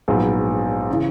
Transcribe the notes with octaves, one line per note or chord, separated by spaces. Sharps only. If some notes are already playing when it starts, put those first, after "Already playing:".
A#1 G#2 F#3 B3
C#3 E3